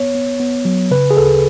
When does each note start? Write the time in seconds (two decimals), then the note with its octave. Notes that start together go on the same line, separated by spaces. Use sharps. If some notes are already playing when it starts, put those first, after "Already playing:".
Already playing: B3 C#5
0.15 B3
0.40 B3
0.65 F#3
0.91 C#3 B4
1.11 G#4
1.17 D2 A4